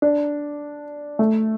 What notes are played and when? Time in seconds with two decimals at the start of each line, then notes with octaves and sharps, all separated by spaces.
0.02 D4
1.19 A3